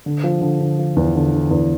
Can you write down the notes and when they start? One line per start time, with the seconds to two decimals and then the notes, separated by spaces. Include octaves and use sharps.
0.06 D3
0.24 F3
0.41 D3
0.60 D3
0.79 F3
0.96 E2
1.15 D3
1.33 D3
1.51 E2